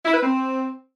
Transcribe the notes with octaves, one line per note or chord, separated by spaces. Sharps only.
E4
B4
C4